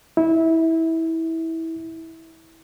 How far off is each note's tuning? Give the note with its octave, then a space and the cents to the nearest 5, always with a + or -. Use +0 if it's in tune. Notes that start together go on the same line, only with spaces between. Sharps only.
E4 -20